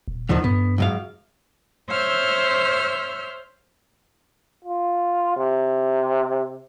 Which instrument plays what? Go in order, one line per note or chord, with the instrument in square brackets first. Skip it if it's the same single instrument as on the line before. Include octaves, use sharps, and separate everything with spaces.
[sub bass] D#1
[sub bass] D2 [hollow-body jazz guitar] D3 D#3 F3
[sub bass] G2 [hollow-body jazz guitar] B3
[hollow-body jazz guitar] C#2 F#2 F5
[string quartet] C5 C#5 E5 E6 F6 G6
[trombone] F4
C3